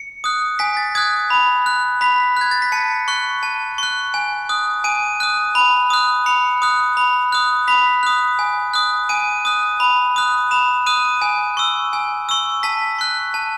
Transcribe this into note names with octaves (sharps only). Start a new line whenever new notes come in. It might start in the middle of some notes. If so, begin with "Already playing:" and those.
Already playing: C#7
D#6 F#6
G#5 B6
A6
D#6 F#6 G#6
B5
F#6
B5 B6
F#6 G#6
A6
B6
A5 C#7
C#6 F#6
A5
C#6 F#6
G#5
D#6 F#6
G#5 D#7
D#6 F#6
B5
D#6 F#6
B5 C#7
D#6 F#6
B5
D#6 F#6
B5 B6
D#6 F#6
G#5
D#6 F#6
G#5 D#7
D#6 F#6
B5
D#6 F#6
B5 E7
D#6 F#6 D#7
G#5
C#6 E6
G#5
C#6 E6
A5 B6
C#6 F#6
A5